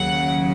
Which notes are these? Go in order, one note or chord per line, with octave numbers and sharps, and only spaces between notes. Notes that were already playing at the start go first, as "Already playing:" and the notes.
Already playing: D#2 C#3 F#3 F#5